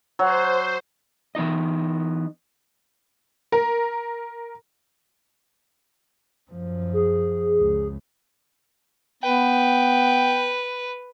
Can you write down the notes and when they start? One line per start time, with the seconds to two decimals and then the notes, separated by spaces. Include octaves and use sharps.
0.19 F#3 C5
1.35 E3 B3 D#4 D#5
3.52 A#4
6.51 F#2 F3
6.93 G#4
7.60 C#2
9.23 B3 B4 G5